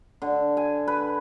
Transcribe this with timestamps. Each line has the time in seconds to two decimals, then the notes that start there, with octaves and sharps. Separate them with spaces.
0.22 D3
0.57 G#5
0.88 B4